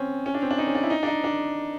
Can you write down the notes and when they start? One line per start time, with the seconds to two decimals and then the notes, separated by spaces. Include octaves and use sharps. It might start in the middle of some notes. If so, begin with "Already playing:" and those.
Already playing: C4 C#4
0.26 C#4
0.34 D4
0.42 C4
0.51 D4
0.58 D#4
0.67 C#4
0.75 D4
0.83 E4
0.90 D#4
1.03 D4
1.07 D#4
1.24 D4